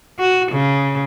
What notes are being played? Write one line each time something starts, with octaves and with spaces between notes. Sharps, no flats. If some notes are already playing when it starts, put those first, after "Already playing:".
F#4
C#3